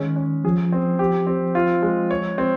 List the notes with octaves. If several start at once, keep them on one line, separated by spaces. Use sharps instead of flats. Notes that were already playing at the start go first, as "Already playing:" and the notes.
Already playing: D#3 G#3 C#4
C#4
F3 G#4
C4
G4
C4
F4
G#3
C#5
C4